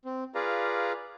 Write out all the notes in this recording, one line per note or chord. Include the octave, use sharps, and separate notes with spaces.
C4
F4 G#4 B4 D5 F5 A#5